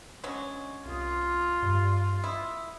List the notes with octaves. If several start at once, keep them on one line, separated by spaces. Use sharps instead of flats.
F#3 G#3 C#4 D4
C2 F4 D#6
G2
E4 D#6